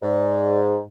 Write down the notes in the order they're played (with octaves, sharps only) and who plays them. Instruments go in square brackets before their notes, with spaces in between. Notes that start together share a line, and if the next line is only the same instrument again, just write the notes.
[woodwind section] G#2 [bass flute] D5